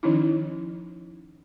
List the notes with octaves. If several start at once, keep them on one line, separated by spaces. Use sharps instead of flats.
D#3 F3 C#4 D#4 E4